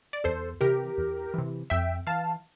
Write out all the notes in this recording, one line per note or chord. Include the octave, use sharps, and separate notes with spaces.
D5
E2 A4 C5
C3 E3 G4 A#4
E2
C3 E3
F2 E5 G5
E3 F5 A5